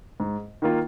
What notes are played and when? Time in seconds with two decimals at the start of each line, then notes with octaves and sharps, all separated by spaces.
0.20 G#2
0.62 D#3 A#3 F4